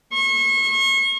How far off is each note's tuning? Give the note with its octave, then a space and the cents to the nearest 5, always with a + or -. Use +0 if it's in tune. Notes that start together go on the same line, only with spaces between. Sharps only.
C#6 -35